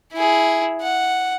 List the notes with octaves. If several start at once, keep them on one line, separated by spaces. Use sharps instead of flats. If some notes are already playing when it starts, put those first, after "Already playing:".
E4 G#4
F#5